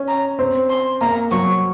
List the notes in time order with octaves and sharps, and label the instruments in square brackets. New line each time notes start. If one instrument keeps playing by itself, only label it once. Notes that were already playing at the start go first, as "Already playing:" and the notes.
Already playing: [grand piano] C#4
[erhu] A#5
[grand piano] C4
[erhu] C6
[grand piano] A#3 [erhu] A#5
[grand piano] F#3 [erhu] C#6